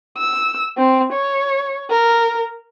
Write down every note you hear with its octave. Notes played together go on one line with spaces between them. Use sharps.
E6
C4
C#5
A#4